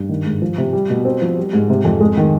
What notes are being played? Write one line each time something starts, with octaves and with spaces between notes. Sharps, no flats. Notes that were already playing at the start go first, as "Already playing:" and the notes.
Already playing: G2
D#3
G#2
F3
C3
G3
B2
C4
F3
G3
G#2
C3
F2
G#3
D#3